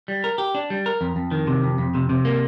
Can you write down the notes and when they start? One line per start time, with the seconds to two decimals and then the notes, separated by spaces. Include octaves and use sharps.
0.08 G3
0.24 A#4
0.38 G4
0.55 D4
0.70 G3
0.86 A#4
1.01 F2
1.16 F2
1.31 D#3
1.47 C3
1.63 F2
1.78 F2
1.94 C3
2.09 C3
2.25 A#3